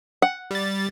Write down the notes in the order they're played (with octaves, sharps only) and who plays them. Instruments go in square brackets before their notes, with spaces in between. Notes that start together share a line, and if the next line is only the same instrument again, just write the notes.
[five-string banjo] F#5
[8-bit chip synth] G3 A6